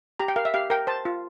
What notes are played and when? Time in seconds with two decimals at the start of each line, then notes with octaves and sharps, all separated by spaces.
0.19 G4 A#5
0.28 G5
0.36 A#4 F5
0.45 E5
0.54 G4 F5
0.70 A#4 G5
0.87 C5 A5
1.05 F4